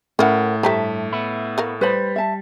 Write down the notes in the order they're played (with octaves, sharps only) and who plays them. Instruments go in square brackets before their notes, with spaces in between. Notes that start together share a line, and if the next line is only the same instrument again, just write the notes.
[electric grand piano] A2 [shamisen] C#4 E4 [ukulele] A#4 F#5
[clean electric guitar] G2 E5 A5 [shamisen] A3 G4 C5 [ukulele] A#5
[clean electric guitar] B3 E4
[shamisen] A3 A#4 F5
[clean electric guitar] G3 [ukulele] B4 C5 B5
[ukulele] E5 A5